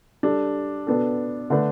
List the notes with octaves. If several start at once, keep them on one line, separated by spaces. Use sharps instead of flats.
G3 D4 A4
B2 B3 D4 A4
D3 A3 D4 B4